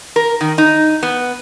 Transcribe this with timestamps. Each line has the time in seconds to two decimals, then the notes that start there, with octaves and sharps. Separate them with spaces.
0.16 A#4
0.41 D#3
0.58 D#4
1.03 B3